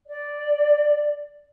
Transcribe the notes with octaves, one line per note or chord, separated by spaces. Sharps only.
D5